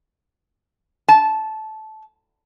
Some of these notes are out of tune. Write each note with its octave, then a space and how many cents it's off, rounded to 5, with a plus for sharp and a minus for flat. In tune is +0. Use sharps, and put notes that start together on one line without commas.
A5 -15